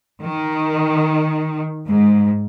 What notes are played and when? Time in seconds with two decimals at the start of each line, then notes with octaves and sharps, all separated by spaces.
0.23 D#3
1.87 G#2